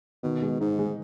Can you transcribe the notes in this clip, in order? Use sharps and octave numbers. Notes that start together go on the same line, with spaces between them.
B2 D#3
G#3
G#2 D#4
G#3